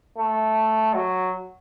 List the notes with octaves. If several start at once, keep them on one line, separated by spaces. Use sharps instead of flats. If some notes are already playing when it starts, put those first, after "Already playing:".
A3
F#3